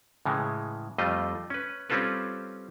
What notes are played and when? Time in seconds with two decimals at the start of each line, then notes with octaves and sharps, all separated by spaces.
0.26 A2 C#3 E3 G#3
0.98 F2 G3 A3 F4 D#5
1.50 C#4 B4
1.90 G3 C4 C#4 F4 A4 B4